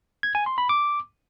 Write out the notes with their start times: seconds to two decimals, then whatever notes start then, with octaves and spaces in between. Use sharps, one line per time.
0.23 G#6
0.35 G#5
0.46 C6
0.58 B5
0.69 D6